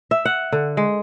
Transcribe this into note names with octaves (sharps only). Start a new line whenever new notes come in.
E5
F#5
D3
G#3